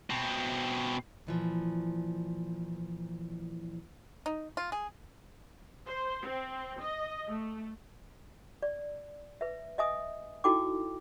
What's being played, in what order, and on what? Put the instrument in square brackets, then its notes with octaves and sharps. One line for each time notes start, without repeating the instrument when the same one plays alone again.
[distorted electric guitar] B2 C4
[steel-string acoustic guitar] A#2 E3 F3
[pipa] D#4
F4
G#4
[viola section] C5
C4
D#5
A3
[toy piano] D5
B4 E5
D#5 E5 G#5 D#6
D#4 E4 F#4 A4 G5 D6